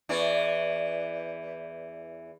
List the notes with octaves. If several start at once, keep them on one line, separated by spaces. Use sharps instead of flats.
E2 E3 D5